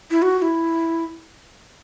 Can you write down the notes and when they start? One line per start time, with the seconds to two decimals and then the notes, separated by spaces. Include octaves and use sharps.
0.11 E4
0.22 F#4
0.39 F#4
0.42 E4